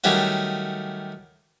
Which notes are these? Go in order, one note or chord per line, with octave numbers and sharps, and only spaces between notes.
D#3 F#3 G3 A3 C#4 F#4